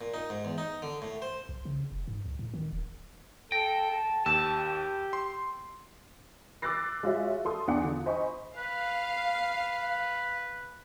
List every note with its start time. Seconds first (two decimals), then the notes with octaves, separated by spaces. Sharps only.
0.01 A#2
0.14 D#4
0.30 G#2
0.45 E2
0.58 D#4
0.82 D3
1.02 A2
1.22 C5
1.49 B1
1.65 C#3
1.92 F1
2.08 G#2
2.25 C#2
2.39 A2
2.54 D#3
2.73 D#1
3.52 A4 G5 A#6
3.91 A5
4.26 D#2 G4 A5 E6
5.13 C6
6.62 D6 E6 F#6 A6 A#6 C7
7.03 G#3 F4 F#4 C#5 E5
7.45 A4 C6 D#6
7.67 E2 D4 F#5
7.83 D3 F4
8.06 C5 D#5 G#5 B5 C#6
8.57 B4 F5